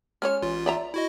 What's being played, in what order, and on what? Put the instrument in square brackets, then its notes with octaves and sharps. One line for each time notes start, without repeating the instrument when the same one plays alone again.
[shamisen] G#3 C#4 C#5 [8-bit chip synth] F6
[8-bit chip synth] A1 F4
[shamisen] D5 E5 A#5
[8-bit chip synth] E4 F#4 D#5